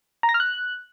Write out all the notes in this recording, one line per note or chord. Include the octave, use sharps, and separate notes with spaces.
A#5
A#6
F6
F#6